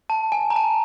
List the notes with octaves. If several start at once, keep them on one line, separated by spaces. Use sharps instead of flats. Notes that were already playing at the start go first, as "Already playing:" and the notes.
A5
G#5
A#5
A5